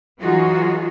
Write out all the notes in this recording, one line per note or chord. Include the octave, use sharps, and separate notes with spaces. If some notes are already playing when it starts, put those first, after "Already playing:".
E3 F#3 D#4 F4 F#4 G#4